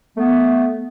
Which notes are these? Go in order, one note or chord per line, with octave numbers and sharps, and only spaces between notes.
A3 B3